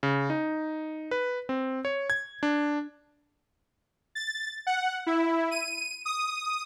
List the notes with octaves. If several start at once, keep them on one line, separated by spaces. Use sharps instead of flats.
C#3
D#4
B4
C4
C#5
G#6
D4
A6
F#5
E4
D#7
D#6